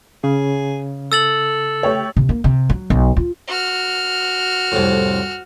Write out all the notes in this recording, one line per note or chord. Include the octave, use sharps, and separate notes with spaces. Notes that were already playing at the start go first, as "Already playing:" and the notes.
C#3 G#4
A4 E6 A6 F#7
A3 G4 C#5
C3
A#3
C3
F#3
B1
F4
F#4 F6
C2 F2 A2